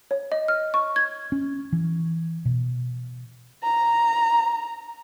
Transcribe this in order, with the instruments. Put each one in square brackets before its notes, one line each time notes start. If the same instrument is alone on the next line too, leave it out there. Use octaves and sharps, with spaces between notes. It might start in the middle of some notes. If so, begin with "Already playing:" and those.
[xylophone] C#5
D#5
F6
C#6
G#6
[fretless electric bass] C#4
E3
B2
[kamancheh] A#5